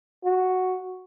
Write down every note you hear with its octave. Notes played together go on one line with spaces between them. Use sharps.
F#4